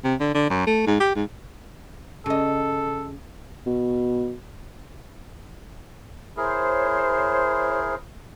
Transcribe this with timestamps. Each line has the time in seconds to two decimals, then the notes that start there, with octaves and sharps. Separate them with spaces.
0.04 C3
0.20 D3
0.34 D3
0.50 F#2
0.66 A3
0.86 G#2
1.00 G4
1.15 G#2
2.26 C#3 A4 D#5
3.66 B2
6.37 E4 G#4 A#4 C5 C#5